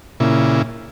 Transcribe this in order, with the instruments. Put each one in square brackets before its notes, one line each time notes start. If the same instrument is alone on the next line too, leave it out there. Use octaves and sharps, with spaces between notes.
[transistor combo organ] A#2 C#3 E4